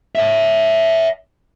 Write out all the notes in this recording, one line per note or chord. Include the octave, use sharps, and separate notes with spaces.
C#5 E5